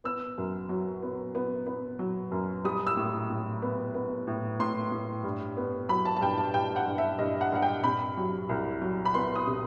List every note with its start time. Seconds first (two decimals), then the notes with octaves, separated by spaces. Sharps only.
0.04 B3 E6
0.38 F#2
0.69 F#3
1.02 B3
1.35 B3
1.67 B3
1.99 F#3
2.32 F#2
2.64 G3 D#6
2.87 E6
2.97 A2
3.30 A2
3.62 B3
3.94 B3
4.27 A2
4.59 A2 C6
4.92 A2
5.24 G2
5.57 B3
5.89 F#3 B5
6.05 A5
6.16 A5
6.21 G2 G5
6.38 A5
6.54 G2 G5
6.76 F#5
6.86 G2
6.98 E5
7.19 G2 D#5
7.41 F#5
7.52 G2 F#5
7.62 G5
7.84 C3 B5
8.17 F#3
8.49 C2
8.82 F#3
9.05 B5
9.14 B3 C6
9.35 D#6
9.47 C3